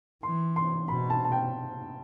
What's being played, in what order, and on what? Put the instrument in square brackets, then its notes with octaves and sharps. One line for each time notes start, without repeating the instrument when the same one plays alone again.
[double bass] E3 [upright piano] C6
[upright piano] C6
[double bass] B2 [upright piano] B5
[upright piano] A5
A5
G5